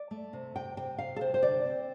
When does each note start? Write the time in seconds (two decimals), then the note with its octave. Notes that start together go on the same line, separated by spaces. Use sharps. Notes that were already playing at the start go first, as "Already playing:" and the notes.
Already playing: D5
0.11 A3
0.33 C3
0.56 C3 G5
0.77 C3 G5
0.98 C3 F5
1.16 A4
1.21 C3 C5
1.34 C5
1.43 D3 D5
1.65 C4